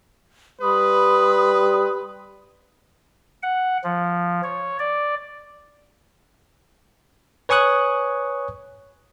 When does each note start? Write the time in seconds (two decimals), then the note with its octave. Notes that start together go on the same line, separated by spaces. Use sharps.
0.61 G3 B4 B5 C6 D#6
3.43 F#5
3.84 F3
4.44 C#5
4.79 D5
7.49 B4 C#5 G#5 C#6 D#6 F#6